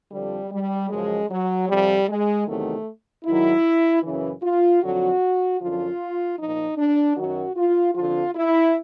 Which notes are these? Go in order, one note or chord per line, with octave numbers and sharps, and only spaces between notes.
F2 D3 F3 G3
G3
F#2 C#3 F3 G#3
F#3
F2 C3 F3 G3
G#3
E2 C3 D#3 F#3 A3
G#2 D#3 F#3 E4
F#2 C#3 E3
F4
F2 D3 F#3 F#4
F#2 D3 F3 F4
A#2 F3 D#4
D4
F#2 D#3 F#3 F#4
F4
F2 D3 F3 F4
E4